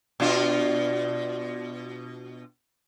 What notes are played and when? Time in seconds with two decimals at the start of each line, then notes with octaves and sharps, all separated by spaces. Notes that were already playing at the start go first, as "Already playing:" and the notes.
0.20 B2 D4 F4